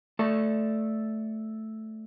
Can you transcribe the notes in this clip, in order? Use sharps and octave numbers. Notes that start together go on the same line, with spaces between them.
A3 A4 D5 A5